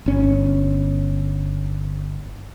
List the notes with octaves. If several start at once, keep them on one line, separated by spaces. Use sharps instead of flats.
G1 C#4